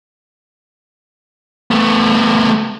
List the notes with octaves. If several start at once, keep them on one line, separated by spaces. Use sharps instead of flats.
A3 B3